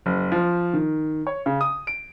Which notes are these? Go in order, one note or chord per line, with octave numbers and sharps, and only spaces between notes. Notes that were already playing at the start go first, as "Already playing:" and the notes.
F#1
F3
D#3
C#5
C#3
D#6
D7